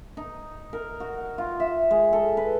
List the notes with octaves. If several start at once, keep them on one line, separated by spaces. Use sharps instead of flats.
D#4
A#4
F#4
F4
E5
G#3
A4
B4